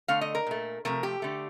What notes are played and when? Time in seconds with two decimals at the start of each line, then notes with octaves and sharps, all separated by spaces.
0.08 D3 A3 F5
0.21 D#5
0.35 A#4
0.47 A#2 A3
0.85 C3 F3 A3 A#4
1.03 G4
1.22 D3 A3